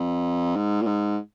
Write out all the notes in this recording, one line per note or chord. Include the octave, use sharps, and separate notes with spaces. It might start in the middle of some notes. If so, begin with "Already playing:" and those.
Already playing: F2
G#2
A#2
G#2